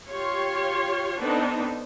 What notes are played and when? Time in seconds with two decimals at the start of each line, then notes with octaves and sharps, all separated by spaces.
0.11 F4 G4 C#5 C6
1.21 B3 C4 D4 D#4 A4